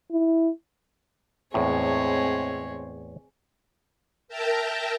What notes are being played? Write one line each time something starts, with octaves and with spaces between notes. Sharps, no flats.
E4
E2 A2 G#3 C4 C#5
A#4 E5 G5 A5 A#5